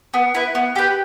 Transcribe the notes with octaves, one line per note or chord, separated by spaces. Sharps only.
B3
E4 B4
B3
G4 B4 G5